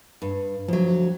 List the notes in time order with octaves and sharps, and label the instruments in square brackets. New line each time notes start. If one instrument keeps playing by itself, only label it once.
[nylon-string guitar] G2
[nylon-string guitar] D2 F#3 [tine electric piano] F3